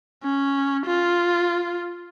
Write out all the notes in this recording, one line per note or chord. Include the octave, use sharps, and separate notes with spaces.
C#4
F4